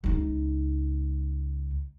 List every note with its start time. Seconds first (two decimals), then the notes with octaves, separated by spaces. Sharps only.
0.04 C#2 D#4